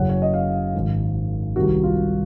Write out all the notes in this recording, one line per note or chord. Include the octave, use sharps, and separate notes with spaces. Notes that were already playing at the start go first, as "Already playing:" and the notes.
Already playing: F#1 F#2 C#3 F#5
C#5
D#5
F5
G#1 G#2 D#3
C2 C3 D#3 F#4
F4